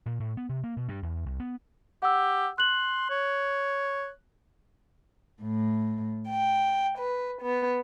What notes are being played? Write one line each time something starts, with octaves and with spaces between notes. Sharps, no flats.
A#2
A2
B3
C3
A#3
B2
G2
E2
C2
B3
G4 F#5 E6
C6 F#6 F#7
C#5
A2
G5
B4
B3